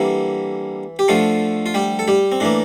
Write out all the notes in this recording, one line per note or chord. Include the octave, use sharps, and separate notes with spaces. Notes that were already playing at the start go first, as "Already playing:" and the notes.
Already playing: D3 E3 G3 A#3 E4
G4
D3 F3 A3 F4
F4
G3 G4
A4
G3 G4
C4
A2 E3 A#3 D4